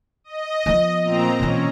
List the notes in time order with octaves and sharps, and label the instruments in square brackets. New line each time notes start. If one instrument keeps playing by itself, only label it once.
[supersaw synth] D#5
[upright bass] F3 B3
[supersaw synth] A#2 C4 A#5
[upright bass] B2 E3 [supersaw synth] C#4